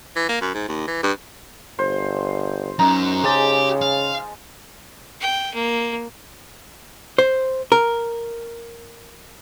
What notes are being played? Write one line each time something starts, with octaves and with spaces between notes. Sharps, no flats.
E3
A#3
F#2
G#2
D#2
E3
G2
G1 C5
F#2 D#4 A#5
C#3 G#3 G4 A5
F5
G5
A#3
C5
A#4